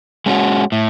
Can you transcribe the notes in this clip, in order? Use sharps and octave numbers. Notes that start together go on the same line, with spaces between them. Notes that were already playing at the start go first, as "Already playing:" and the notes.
G#3 C#4 F#4
A2